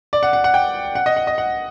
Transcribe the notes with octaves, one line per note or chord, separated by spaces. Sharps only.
D5
F#5
F#5
F#5
G5
F#5
D#5
F#5
D#5
F#5